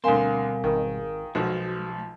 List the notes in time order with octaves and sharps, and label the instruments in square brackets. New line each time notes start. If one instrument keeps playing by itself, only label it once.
[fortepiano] D2 C6 [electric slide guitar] B2 G3 C4 [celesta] A#4 F5 G#5
[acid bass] G#1 [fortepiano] D#3
[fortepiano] B1 F3 [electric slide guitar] G#3 [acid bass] F#4